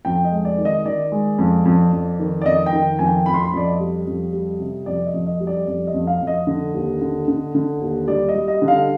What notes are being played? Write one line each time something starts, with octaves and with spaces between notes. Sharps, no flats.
F2 G5
D#5
G#3
D5
D#3
D#5
D#3 D5
G#3
F2
F2
F2
D#3
D5
F2 D#5
G5
D#3
F2 G#5
G5
F2 B5
C6
B5
F2 D5
D#5
G3
F2
G3
C3
F2 D5
D#5
F2
D#5
G3
D5
F2 D5
D#5
F2
F5
F2
D#5
D3
D#2
D3
D3
D3
D#2
G3 D5
D#5
G3
D#5
D3
F5